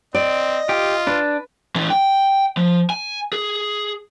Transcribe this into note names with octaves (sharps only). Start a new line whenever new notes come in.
C4 D5 D#5
F4 G4
D4 B4
E3 C#4
G5
F3
G#5
G#4